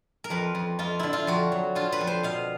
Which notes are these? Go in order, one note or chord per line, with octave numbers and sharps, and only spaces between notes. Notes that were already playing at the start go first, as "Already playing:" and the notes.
A#4
F2 B4
F2
F2 F4
D3 E4
F4
F2 F#4
F#3
D3 F4
B4
F2
C5
B2 F5